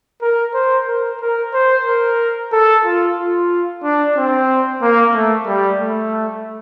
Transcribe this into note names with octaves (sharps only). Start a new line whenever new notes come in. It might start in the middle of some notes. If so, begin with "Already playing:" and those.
A#4
C5
A#4
A#4
C5
A#4
A4
F4
F4
D4
C4
A#3
A3
G3
A3